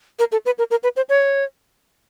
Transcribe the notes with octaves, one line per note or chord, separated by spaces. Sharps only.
A#4
A4
B4
A#4
A#4
B4
C5
C#5